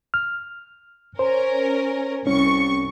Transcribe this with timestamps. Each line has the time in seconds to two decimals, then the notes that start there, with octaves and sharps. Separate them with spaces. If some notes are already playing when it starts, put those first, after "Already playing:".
0.14 F6
1.19 C#4 A#4 C5
2.27 C2 C#4 C#6